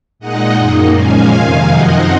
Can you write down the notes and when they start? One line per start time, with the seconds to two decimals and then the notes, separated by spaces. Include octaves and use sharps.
0.19 A#2 G#3 D#4 D#5 F#5
0.57 F#2 D#3 A#3 D#4
0.94 A#2 F3 G#3 C#4 F5 G#5
1.32 F2 C3 D#3
1.69 F#2 F3 C4 D#4 D#5 F#5